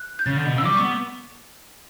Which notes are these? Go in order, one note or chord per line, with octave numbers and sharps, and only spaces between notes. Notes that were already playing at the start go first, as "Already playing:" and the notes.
Already playing: F#6
G6
C#3 A6
D3
B2
C#3 E6
G3 D6
B3 C#6